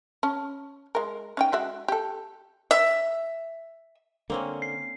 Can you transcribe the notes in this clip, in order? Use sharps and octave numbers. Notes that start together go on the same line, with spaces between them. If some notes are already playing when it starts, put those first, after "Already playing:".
C#4 A5
G#3 A#4
C#4 D#4 G5
G#3 F#4 E5
G4 A4
E5
D3 A#3 C4 C#4
C7